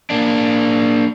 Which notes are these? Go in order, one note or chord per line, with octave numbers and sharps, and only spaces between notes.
A#3 D4